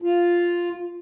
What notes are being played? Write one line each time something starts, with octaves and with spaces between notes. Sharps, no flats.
F4